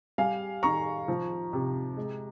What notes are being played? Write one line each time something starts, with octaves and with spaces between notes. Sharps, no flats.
G3 F5 G#5
D#3 A#5 C#6
F3
C3
G#3